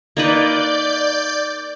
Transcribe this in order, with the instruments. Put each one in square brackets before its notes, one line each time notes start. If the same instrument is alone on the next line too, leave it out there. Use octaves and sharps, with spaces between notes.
[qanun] A#3 D#4 B4 [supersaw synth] D5 G6